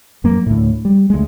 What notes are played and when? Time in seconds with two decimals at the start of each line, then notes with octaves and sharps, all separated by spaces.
0.24 F#2 F#3 A#3
0.46 D2 A2
0.85 G3
1.10 D2 G#3